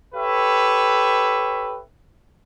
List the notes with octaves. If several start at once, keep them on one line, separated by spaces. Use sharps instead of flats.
G4 A4 B4 C#5 E5